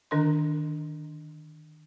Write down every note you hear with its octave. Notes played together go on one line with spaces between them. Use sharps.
D3 D#3 D4 A#4 D#5 C6